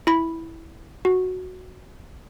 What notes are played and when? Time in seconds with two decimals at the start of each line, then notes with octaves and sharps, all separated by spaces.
0.07 E4 B5
1.05 F#4